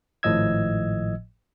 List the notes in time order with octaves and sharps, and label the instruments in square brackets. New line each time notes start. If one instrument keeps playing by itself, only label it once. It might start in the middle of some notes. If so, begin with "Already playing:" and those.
[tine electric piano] G#1 A2 F3 D#5 E6 G#6